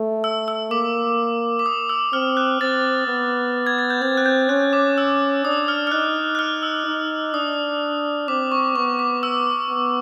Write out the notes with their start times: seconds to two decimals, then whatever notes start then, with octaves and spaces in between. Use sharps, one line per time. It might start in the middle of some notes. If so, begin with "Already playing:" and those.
Already playing: A3
0.24 E6
0.48 E6
0.71 A#3 D6
1.59 D6
1.66 D#6
1.89 E6
2.13 C4 F6
2.37 F#6
2.61 C4 A6
3.08 B3
3.67 G#6
3.79 A6
3.90 G6
4.02 C4 G#6
4.17 F#6
4.26 G6
4.49 C#4 F#6
4.73 D6
4.98 E6
5.45 D4 D#6
5.68 F6
5.87 F6
5.92 D#4 F#6
6.35 F#6
6.39 F6
6.63 E6
6.87 D#4
7.34 D4 D#6
8.28 C4 D6
8.52 C#6
8.76 B3 C#6
8.99 D6
9.23 E6
9.70 B3